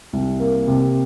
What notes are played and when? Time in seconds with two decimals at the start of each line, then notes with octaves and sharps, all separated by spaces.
0.13 C2
0.40 A#3
0.68 C3